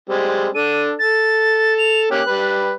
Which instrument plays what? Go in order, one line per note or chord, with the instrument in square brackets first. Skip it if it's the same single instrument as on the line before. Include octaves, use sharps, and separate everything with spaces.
[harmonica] G3 G#3 C4
[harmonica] D4 A4 [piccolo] D#7
[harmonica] A4 [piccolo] A6
[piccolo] F7
[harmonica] A#3 C#4 G4 [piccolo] F#6
[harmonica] G3 B4